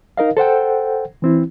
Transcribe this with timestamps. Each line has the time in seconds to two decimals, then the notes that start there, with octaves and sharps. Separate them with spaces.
0.17 D#4 A#4 D#5 F5
0.37 A4 C5 F#5 G5
1.22 E3 C4 E4